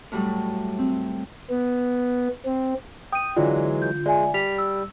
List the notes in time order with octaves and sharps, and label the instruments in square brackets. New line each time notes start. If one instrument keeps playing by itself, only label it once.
[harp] A2 F#3 G3 A3
C4
[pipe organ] B3
C4
[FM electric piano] G5 [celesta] D#6 D#7
[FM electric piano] D3 F4 [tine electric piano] E3 F#3 G#3 [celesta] D5
[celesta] G6
[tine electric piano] G#3 [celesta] D5 E5 G#5
[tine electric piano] G3 [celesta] B6 F7
[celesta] E6